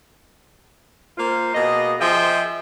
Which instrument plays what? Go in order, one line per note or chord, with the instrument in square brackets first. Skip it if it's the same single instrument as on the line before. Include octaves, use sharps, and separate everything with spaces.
[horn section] A#3 F4 C5
B2 A#3 G#4 D#5
F3 G#4 C5 D#5 E5 G5